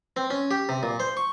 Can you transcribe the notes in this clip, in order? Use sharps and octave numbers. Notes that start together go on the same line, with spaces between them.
C4
C#4
G4
C3
A#2
C5
C#6